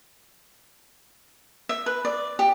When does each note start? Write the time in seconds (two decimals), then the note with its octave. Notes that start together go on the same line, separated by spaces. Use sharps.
1.69 E5
1.86 B4
2.05 D5
2.39 G4